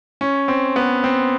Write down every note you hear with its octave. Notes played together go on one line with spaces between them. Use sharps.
C#4
C4
B3
C4